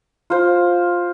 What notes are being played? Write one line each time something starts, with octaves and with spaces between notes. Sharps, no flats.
F4 C5